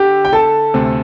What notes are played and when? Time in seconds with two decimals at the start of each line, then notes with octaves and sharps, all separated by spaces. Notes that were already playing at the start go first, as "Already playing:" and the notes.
Already playing: D3 G4
0.25 G5
0.33 A4 A5
0.74 D2 C3 A3 C4